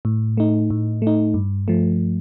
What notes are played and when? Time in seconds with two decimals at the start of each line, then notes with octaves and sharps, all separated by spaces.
0.05 A2
0.37 A3 D#4
0.70 A2
1.02 A3 D#4
1.34 G2
1.68 F3 A3